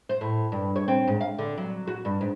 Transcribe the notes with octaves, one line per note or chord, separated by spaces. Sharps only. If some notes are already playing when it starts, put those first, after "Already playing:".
C5
A2
G2
C#5
C4
G#2
F5
D3
F#3
F#4
G2
G#2